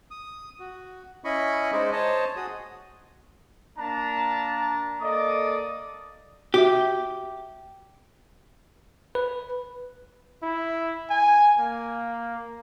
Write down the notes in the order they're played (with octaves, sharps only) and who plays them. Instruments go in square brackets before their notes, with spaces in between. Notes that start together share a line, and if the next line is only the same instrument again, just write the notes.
[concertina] D#6
F#4
C#4 E4 D#5 B5 C#6
G#3 D#4 G#4 C5 D5 D#5
C5 C#5 D#5 A5
F#4 G#4 D#6
[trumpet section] A#3 D4 A5 A#5
A#3 A4 D5 D#5 D6 D#6
[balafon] F#4 E5 [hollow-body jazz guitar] G4
[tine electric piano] B4
[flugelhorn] E4
G#5
A#3